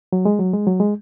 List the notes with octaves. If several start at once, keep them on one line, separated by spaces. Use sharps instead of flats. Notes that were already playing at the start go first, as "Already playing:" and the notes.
F#3
G#3
F#3
G#3
F#3
G#3